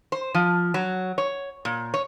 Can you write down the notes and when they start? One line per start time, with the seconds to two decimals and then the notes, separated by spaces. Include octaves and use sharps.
0.12 C5
0.34 F3
0.74 F#3
1.18 C#5
1.65 A#2
1.94 C#5